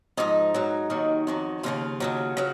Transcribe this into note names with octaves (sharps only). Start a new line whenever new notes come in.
G#2 F3 D#4
G#2 F#3
D#2 D#3 F#3
F2 D#3 F#3
D#2 C#3 F3 F4
D#2 C#3 F#3
C#3 F#3